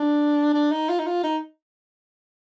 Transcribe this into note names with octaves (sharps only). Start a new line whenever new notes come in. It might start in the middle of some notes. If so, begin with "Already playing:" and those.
Already playing: D4
D4
D#4
F4
D#4
F4
D#4